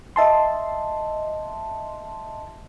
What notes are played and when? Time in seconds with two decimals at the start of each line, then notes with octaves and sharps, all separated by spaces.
0.16 D#5 E5 A5 C6